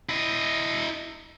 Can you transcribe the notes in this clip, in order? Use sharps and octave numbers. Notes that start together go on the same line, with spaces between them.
E4 D#5